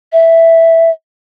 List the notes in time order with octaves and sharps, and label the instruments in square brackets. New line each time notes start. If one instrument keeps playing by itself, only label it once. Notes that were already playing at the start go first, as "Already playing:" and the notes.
[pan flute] E5